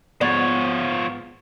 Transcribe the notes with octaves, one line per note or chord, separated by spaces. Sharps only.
G#2 F3 B3 C#5 D5